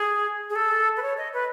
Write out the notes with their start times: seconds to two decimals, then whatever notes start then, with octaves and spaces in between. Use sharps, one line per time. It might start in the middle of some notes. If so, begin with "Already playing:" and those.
Already playing: G#4
0.50 G#4
0.56 A4
0.97 B4
1.02 C#5
1.17 D#5
1.34 B4